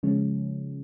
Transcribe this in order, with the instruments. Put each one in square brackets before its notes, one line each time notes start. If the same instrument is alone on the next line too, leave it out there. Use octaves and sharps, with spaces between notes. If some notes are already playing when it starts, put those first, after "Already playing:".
[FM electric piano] C#3 F3 G#3 C#4